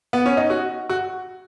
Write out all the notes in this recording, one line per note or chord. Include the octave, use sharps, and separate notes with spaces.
B3
C#4
D#4
F#4
F#4